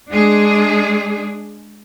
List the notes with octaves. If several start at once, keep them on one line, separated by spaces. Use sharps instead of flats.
G#3 D4 G#4